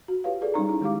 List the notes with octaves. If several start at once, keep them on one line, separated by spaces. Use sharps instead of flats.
F#4
F4 G4 B4 C#5 F5
G#4 A4 D5
G3 C#4 D#4 A#5
E4
D#3 G#3 E4 G4 F5 D6